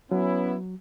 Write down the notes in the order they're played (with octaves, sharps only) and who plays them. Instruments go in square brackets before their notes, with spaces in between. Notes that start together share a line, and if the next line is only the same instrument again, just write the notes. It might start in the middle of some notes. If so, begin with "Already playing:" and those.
[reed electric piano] F#3 [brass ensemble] B3 C#4 E4